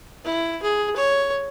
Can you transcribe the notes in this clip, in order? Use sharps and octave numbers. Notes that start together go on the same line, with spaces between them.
E4
G#4
C#5